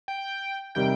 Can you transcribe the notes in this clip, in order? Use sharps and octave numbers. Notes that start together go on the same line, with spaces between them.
G5
C3 D#3 G3 G5